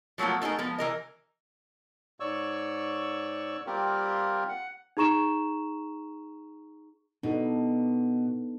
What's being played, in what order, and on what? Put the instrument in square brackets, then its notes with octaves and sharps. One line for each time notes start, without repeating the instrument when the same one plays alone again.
[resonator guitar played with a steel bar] F3 F#3 A3 A#3 F4
A3 D#4 G#4 A#4
F3 G#3 B3
E3 A#4 D#5
[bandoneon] G#2 C#5 D5 C#6 E6
G3 A#3 C4 F4 G4 A#4
F#5
[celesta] D#4 G#4 A#5 C#6 E7
[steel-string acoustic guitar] B2 [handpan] D4 D#4 A4